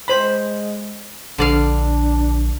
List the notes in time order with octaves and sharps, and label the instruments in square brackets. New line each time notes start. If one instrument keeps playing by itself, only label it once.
[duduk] G#3 [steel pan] C5 B5
[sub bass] A#1 [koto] D3 D5 F5 [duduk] D4